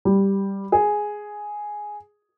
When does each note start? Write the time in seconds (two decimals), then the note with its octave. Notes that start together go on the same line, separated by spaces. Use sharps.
0.05 G3
0.72 G#4